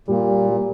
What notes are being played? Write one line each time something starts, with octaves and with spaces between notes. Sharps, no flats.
A#2 G3
G3